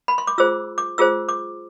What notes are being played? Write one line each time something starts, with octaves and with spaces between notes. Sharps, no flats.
B5
C6
D6
F4 G#4 C5 E6
D6
F4 G#4 C5 E6
D6